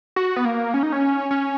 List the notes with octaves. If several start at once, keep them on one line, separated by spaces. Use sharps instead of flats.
F#4
B3
A#3
C#4
D#4
C#4
C#4